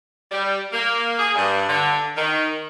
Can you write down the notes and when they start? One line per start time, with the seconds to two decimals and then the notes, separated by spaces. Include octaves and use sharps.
0.31 G3
0.72 A#3
1.19 G#4
1.35 G2
1.68 D3
2.15 D#3